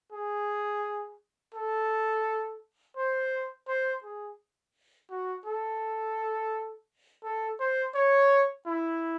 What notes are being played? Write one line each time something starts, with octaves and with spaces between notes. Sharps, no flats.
G#4
A4
C5
C5
G#4
F#4
A4
A4
C5
C#5
E4